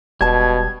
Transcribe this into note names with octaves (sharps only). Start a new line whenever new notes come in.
E1 B2 G3 A5 G#6